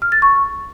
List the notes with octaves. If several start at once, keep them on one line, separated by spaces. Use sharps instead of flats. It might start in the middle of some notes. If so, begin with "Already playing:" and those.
F6
A6
C#6